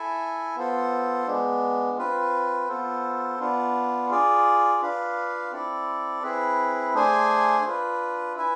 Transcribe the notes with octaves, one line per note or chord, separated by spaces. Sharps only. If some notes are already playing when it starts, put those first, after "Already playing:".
Already playing: E4 A4 E5 G#5
B3 F4 A4 C5
G#3 B3 D4
C4 F4 B4
B3 F4 A4 C5
B3 D4 F4
F4 G#4 D5
D4 F4 B4 F5
C4 E4 A4 D5
C4 E4 G#4 B4
A3 D4 G#4 C5 G#5
D4 F4 B4
E4 B4 E5 G#5